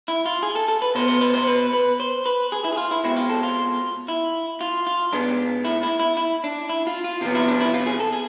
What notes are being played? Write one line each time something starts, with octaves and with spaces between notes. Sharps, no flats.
E4
F4
G#4
A4
A4
B4
B2 B3 C5
C5
B4
C5
B4
B4
C5
B4
G#4
E4
G#4
F4
E4
B2 G#3 C4 E4
F4
A4
F4
E4
F4
F4
G#2 G#3 B3 D4
E4
E4
E4
E4
D4
E4
F4
F4
C3 F3 B3 F4
E4
D4
E4
F4
G#4
A4
G#4